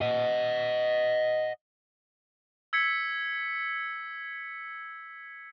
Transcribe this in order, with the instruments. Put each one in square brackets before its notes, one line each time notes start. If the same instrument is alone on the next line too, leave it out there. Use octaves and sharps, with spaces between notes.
[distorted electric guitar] D#5 F#5
[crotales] E6 G#6 B6 C#7